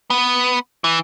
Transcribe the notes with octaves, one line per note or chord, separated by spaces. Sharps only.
B3
E3